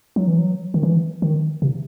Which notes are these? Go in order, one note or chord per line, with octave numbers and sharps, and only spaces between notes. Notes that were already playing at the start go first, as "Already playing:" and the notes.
F#3
E3
F#3
D#3
E3
D#3
C3